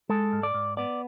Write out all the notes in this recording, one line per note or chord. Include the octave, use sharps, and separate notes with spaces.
G#3 A4
G#2
D5
G#2
B3 D5